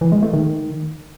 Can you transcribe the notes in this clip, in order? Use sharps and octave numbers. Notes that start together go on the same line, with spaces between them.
E3
G#3
A3
D#3